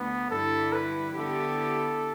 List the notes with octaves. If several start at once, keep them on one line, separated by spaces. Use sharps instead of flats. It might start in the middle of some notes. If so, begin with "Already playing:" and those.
Already playing: D2 D3 A3 B3
G2 D3 G3 E4 A4
B4
D3 B3 E4 G4 A4